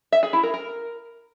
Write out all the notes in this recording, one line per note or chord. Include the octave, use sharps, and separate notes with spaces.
E5
G#4
E4
A#4
A#4